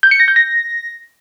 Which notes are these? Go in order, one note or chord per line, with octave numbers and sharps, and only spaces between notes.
G6
C#7
A#6
G6
A#6